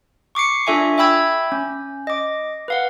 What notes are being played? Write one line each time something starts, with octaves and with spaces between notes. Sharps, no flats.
C#6 D6 C7 C#7
D4 F4 A4 E5 G#5 C#6
E5 G5 B5 E6 G#6
C#4
D#5 D6
B4 F5 F#5